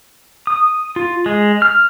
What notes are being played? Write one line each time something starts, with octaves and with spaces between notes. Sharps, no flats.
D#6
F4
G#3
F6